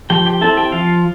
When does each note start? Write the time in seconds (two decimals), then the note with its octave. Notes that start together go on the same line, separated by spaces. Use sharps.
0.10 F3 G4 G5
0.26 G4 G5
0.41 C4 E4 A4 A5
0.57 G4 G5
0.72 F3 F4 F5